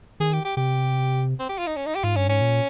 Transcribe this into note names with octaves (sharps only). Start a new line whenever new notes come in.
D#3 G#4
G4
G4
C3 G4
C4
G4
F4
D#4
C#4
D#4
G4
G#2 F4
G2 C#4
G#2 C#4
A#2